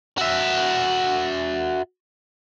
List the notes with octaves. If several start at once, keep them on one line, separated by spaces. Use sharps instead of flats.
F#4 E5